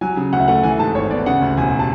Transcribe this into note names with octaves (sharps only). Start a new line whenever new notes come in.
F#3 G#5
C#3
D2 F#5
E5
A3 F#5
E3 G#5
G#2 A5
G#1 C#5
B3 D5
C#3 F#5
D2
E1 G#5
A5